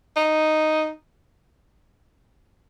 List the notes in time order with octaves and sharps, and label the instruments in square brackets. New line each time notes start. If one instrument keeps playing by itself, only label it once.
[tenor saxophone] D#4